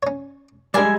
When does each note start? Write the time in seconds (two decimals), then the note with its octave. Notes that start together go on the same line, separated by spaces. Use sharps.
0.03 C#4 C#5
0.74 G3 G#3 D4 A#4 D5 E5 G#5